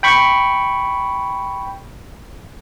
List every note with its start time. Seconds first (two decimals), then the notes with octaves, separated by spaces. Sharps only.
0.03 G5 B5 C#6